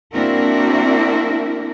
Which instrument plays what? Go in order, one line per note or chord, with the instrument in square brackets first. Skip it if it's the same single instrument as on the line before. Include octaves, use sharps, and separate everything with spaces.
[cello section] A#3 C4 D4 E4 F#4 A#4